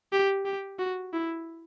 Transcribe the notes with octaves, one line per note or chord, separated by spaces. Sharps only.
G4
G4
F#4
E4